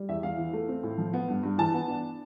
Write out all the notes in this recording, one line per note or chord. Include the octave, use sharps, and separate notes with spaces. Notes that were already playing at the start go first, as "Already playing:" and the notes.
Already playing: G3
E2 E5
E2 F5
E3
A3
C4
A2
F3
B3
G2
G2
E3 A5
B3
D4